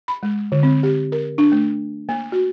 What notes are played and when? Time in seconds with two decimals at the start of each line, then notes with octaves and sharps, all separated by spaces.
0.08 B5
0.23 G#3
0.52 D3
0.63 C4
0.83 G4
1.12 A#4
1.38 D4
1.52 A3
2.09 A#3
2.32 F#4